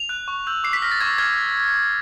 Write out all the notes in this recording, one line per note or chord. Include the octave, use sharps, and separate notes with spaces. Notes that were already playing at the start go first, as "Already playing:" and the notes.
Already playing: F7
F#6
C#6
E6 G6
D6 C7
B6
F6 A#6
A6
C#6 G#6
F6 G#6